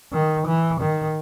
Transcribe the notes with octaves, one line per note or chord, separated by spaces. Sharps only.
D#3
E3
D#3